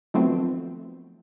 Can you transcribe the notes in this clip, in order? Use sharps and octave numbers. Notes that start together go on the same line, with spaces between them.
D#3 F3 F#3 A3 B3 C4